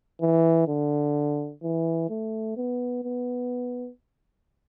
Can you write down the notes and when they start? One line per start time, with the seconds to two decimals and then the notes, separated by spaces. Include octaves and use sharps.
0.21 E3
0.67 D3
1.63 E3
2.10 A3
2.57 B3
3.04 B3